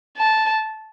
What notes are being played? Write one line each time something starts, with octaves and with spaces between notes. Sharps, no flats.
A5